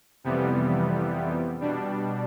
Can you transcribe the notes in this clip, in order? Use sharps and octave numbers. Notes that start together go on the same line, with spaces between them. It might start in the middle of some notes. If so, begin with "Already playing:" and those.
F2 C3 E3 G3 B3
B2 G3 D4